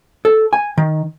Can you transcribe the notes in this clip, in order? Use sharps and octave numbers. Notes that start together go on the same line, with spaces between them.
A4
G#5
D#3